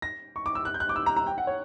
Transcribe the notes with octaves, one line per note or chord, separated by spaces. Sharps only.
A#6
C#6
D6
E6
F#6
G6
F#6
D6
E6
A#5
A#5
G5
F#5
C#5